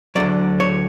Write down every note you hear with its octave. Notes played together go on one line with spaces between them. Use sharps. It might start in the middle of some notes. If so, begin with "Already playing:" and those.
D2 D3 F#3 D5
C#5